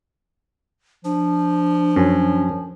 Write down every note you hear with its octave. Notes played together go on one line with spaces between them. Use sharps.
F3 D4
F#2 C#4 G#5